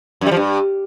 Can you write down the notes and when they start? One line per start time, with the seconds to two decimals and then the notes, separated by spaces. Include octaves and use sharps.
0.21 F#2
0.26 G3
0.31 F3
0.36 G2